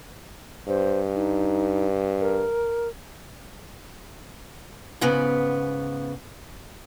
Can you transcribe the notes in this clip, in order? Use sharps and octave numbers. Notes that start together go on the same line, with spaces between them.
G2 C5
D#4
A#4
G#2 C#3 B3